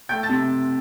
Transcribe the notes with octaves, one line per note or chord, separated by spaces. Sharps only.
A3 G5 G6
A5 A6
C3